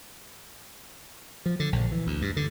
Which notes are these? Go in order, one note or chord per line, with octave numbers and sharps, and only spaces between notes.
F3
D3
A#1
E3
D2
G2
D3